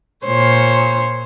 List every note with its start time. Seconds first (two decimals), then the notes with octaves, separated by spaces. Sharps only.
0.25 A#2 C5 C#5